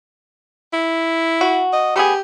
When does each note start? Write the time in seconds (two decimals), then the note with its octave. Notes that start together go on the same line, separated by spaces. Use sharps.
0.73 E4
1.41 F#4
1.73 D#5
1.96 A3 B3 G4 G#4